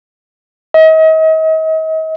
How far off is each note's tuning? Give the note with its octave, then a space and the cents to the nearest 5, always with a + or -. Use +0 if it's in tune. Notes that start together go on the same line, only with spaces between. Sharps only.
D#5 +40